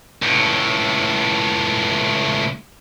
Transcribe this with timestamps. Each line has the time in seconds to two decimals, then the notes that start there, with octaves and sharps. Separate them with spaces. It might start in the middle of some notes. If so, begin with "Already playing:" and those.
0.22 C#2 A2